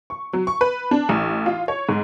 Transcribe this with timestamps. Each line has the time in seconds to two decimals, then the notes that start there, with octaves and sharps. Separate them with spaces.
0.10 C#6
0.33 F#3
0.47 C#6
0.61 B4
0.91 D4
1.09 A1
1.46 F4
1.68 C#5
1.89 G#2